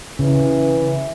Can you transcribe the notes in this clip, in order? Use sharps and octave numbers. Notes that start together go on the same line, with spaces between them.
C#3 E3